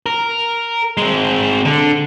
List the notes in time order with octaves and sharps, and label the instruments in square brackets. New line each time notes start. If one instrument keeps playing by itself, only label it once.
[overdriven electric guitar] A#4
G#3 C4
D3